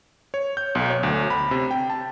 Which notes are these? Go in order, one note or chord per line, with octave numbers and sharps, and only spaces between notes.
C#5
G6
B1
C#5
D2
B5
C3
G5
A5